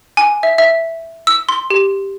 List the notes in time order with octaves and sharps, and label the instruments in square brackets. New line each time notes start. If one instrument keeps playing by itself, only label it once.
[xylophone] G#5
E5
E5
E6
C6
G4